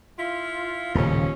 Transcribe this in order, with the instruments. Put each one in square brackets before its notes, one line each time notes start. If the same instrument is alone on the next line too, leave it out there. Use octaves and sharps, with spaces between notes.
[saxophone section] E4 F4
[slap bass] D#1 A2 C#3 [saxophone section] D#2 F3 C#4